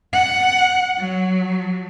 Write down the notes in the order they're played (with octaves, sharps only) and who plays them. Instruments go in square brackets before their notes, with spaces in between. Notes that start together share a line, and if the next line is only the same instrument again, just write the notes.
[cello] F#5
F#3